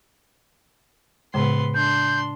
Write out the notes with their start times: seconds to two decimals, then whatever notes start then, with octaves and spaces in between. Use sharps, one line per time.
1.34 A2 C#3 G#3 B3 C6
1.75 D4 C6 G6